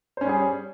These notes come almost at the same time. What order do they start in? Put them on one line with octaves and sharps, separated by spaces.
C5 C#4 G3 G#4